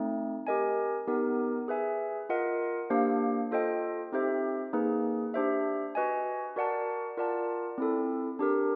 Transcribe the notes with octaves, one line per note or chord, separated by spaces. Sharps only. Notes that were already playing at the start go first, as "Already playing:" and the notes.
Already playing: A3 C4 D#4
G4 A#4 D#5 G#5
B3 D#4 G4 A#4
G#4 B4 E5 G#5
F4 A#4 D#5 F#5
A#3 D4 G4 C5 F5
F4 A4 C5 D#5 G5
C4 D#4 G4 C5 E5
A#3 D#4 G#4 B4
D4 G4 C5 E5
F#4 B4 D#5 G#5
F#4 A#4 D5 F#5 A5
F4 A#4 D5 F#5 A5
C4 E4 A4
D4 G4 A#4